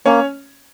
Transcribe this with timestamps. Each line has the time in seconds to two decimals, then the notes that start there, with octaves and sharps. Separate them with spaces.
0.06 A#3 C#4 C#5